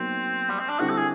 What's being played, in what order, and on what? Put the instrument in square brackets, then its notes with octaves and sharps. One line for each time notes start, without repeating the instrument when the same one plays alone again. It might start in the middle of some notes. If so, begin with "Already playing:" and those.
Already playing: [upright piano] B2 F#3 A#3 D#4 [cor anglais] C4
[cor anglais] G3
C4
D4
[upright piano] D3 G3 C4 E4 [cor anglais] F#4
[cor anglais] A4
G#4